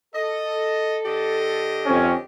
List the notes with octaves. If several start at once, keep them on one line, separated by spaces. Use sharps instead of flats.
A4 D#5
D3 G4 D#5
F2 C4 C#4